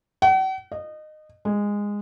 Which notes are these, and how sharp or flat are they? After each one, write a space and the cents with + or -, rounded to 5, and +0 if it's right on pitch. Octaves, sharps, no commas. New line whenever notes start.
F#5 +45
D#5 -20
G#3 -15